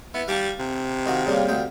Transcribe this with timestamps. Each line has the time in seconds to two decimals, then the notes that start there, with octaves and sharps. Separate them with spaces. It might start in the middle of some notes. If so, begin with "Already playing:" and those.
0.14 B3 E4
0.28 G3 F5 A5 C#6
0.60 C3
1.06 D#3 F#4 F5
1.26 C#3 G3 A#3
1.48 D2 F5 G5